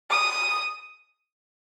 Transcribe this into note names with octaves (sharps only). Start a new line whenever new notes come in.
D#6